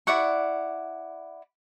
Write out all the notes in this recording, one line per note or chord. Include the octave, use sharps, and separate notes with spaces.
E4 D5 F#5 C#6